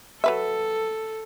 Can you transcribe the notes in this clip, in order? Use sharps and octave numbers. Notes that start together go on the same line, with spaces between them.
F#3 A4 B4 E5